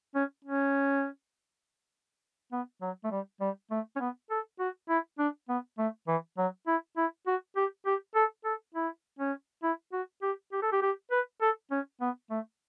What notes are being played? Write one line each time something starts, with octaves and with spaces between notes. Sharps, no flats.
C#4
C#4
B3
F#3
A3
G3
G3
A3
C#4
B3
A4
F#4
E4
D4
B3
A3
E3
F#3
E4
E4
F#4
G4
G4
A4
A4
E4
C#4
E4
F#4
G4
G4
A4
G4
G4
B4
A4
C#4
B3
A3